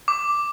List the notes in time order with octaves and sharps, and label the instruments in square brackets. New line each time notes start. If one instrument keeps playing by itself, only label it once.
[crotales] D6